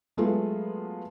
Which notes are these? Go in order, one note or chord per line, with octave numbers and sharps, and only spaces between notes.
F#3 G#3 A3 B3 F4